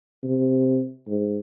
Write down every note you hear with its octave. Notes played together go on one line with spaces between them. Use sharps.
C3
G#2